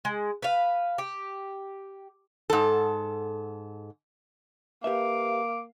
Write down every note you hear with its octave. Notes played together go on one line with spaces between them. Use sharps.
G#3
B4 F5
G4
G#2 A4
A#3 G4 B4 E5 F5 D6